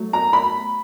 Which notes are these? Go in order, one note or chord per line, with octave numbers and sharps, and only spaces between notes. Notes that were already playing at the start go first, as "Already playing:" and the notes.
Already playing: F#3 A3
A#5
B5